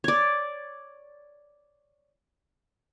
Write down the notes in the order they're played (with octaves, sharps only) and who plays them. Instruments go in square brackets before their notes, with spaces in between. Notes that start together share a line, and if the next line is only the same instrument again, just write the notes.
[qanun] C#5 D5